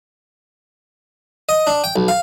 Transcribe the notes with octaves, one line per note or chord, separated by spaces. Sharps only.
D#5
D4
G5
B1
F5